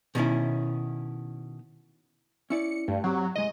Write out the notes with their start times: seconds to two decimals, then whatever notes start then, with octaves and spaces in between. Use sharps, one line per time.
0.15 B2 D#3 C#4 E4
2.50 C#4 E4 D5 C#7
2.88 G2 A3
3.04 F#3 C4 G4
3.36 C2 G#3 D#5